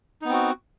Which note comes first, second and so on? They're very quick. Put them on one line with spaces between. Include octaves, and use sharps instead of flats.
D#4 B3 C4 F#4